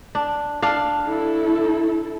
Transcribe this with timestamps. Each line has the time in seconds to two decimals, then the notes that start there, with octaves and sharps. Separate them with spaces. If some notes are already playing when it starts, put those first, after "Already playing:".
0.15 D4
0.62 D4 F5
1.06 E4 A4